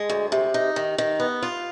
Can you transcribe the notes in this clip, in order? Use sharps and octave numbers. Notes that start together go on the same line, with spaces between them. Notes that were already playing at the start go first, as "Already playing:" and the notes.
Already playing: G#3
D2
C3
D#4
D#3
D#3
B3
F4